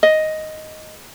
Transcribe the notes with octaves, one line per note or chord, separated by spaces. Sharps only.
D#5